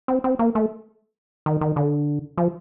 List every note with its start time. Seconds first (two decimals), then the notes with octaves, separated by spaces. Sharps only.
0.08 C4
0.24 C4
0.39 A#3
0.55 A3
1.46 D#3
1.61 D#3
1.76 D3
2.38 F3